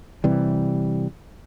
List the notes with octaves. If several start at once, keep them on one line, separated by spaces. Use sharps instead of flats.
C3 E3 G3